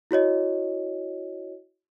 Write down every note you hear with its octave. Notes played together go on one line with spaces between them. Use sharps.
E4 F#4 C#5 D#5